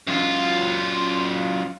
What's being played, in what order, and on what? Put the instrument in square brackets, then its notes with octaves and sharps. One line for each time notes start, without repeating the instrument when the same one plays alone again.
[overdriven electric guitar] F#2 F4